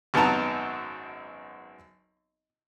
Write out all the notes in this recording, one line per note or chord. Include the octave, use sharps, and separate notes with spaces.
G#1 F#2 B3 D#4 A5 A#5